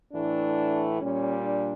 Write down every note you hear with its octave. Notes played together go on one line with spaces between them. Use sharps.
A2 E3 A3 D4
A#2 G3 C#4
D4